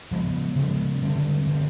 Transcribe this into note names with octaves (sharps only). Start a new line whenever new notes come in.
C#3 F3 G#3 B3
C#3 F3 G#3 B3
D3 G3 C4
D3 G3 C4